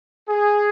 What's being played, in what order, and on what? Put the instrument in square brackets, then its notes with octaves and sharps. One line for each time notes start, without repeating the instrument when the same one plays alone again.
[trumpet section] G#4